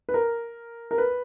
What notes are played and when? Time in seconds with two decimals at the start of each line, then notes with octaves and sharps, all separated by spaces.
0.09 B4
0.14 A#4
0.91 A#4
0.98 B4